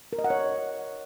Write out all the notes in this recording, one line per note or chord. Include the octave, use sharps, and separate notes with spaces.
A#4
D#5
F#5
C#5